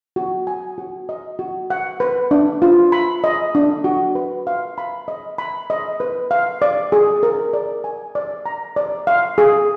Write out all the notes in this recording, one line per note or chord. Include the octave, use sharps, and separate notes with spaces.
F#4
G#5
F#4
D#5
F#4
F#5
B4
D4
F4
B5
D#5
D4
F#4
B4
F5
B5
D#5
B5
D#5
B4
F5
D5
G#4
A#4
D5
G#5
D5
A#5
D5
F5
G#4